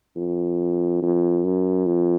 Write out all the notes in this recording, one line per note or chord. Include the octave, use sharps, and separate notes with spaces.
F2
F2
F#2
F2